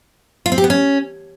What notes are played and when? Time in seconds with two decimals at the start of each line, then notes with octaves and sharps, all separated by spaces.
0.46 F4
0.52 C4
0.58 G4
0.64 B3
0.70 C#4